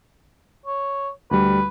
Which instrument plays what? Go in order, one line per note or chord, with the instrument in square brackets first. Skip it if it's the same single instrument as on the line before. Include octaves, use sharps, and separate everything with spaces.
[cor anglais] C#5
[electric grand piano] D2 G3 [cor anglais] B4